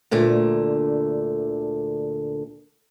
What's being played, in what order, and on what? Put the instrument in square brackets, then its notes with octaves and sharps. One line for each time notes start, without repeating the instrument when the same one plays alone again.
[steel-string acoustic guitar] D2 A#2 D3 A3